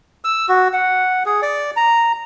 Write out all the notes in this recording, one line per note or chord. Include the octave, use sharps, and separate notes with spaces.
E6
F#4
F#5
G#4
D5
A#5